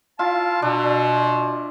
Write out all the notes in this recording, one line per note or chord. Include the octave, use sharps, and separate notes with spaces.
E4 F4 F5 A5
B2 D4